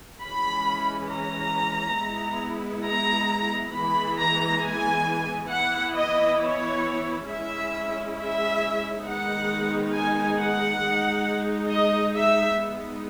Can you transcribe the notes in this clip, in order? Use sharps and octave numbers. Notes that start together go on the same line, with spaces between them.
E3 G#3 C#4 B5
A#5
G#3 B3 E4
A#5
E3 G#3 B3 B5
A#5
G#5
E3 B3 E4 F#5
D#5
C#5
G#3 C#4 E4 E5
E5
D#3 G#3 B3 D#4 F#5
G#5
F#5
G#3 D#4
D#5
E5
G#3 B3 D#4